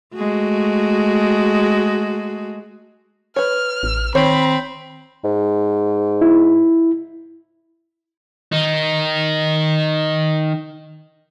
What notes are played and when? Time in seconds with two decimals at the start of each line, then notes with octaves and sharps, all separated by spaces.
0.15 G#3 A3 F#4
3.36 B4 C#5 F6
3.83 A1
4.15 D#3 C4 C#5 B5
5.24 G#2
6.21 E4
8.52 D#3 D#4